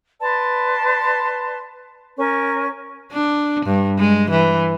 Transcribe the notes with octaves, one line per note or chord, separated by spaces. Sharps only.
B4 D5 A5 C6
C#4 A#4 C#6
D4
G2
G#3
E3